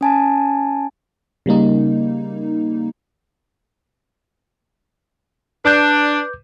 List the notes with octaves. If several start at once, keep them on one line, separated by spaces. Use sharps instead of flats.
C#4 G#5 A5
C#3 G3 A#3 D#4
D4 B4 D6 G6